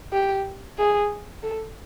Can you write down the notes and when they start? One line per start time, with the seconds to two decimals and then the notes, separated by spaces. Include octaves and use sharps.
0.13 G4
0.78 G#4
1.43 A4